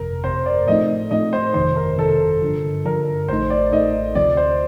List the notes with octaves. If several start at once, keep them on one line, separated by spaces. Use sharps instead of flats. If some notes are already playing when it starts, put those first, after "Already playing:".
Already playing: G1 F2 C3 A#4
G1 F2 C3 C5
D5
A2 F3 A3 C4 D#4 D#5
A2 F3 A3 C4 D#4 D#5
C5
G1 F2 C3 D#3 C5
A#4
G1 F2 C3 D#3 A4
G2 D3 F3
G2 D3 F3 A#4
A1 A2 A3 D#4 C5
D5
A1 A2 A3 D#4 D#5
D2 C3 F3 C4 D5
C5